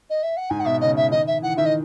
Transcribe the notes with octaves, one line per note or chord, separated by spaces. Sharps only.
D#5
E5
F#5
G#2 G#5
F#5
B2 E5
C#3 D#5
E5
D#3 D#5
E5
E3 F#5
D#3 E5
D#5